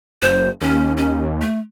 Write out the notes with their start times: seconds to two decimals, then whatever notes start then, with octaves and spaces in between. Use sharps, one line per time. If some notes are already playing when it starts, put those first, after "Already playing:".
0.22 F#1 C5
0.61 D#2 C#4
0.97 C#4
1.42 A3